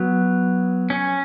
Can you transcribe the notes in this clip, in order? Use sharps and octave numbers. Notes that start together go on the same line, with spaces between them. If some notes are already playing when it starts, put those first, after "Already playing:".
Already playing: F#3 B3
C#4